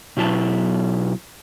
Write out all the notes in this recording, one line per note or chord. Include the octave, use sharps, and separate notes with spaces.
B2 F#3 E4 A5